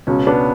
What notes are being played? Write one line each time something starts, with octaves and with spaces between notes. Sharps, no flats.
C#2 B2 C#4
B3 D4